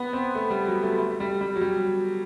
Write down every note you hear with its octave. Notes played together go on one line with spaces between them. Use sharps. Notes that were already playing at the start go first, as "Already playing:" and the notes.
Already playing: B3
C4
A3
G3
F#3
A3
A3
G3
G3
F#3
G3